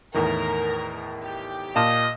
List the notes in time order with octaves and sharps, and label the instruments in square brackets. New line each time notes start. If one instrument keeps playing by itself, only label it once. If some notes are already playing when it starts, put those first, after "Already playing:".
[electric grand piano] E2 A2 D#3 [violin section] A#4
[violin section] G4
[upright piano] A#2 A5 E7 [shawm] D#5 [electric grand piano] F5